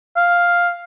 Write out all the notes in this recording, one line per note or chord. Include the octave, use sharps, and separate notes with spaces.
F5